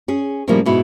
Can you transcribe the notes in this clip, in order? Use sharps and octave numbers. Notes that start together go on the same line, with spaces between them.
C#4 G#4
A2 C#3 F3 G3 A#3
G#2 B2 E4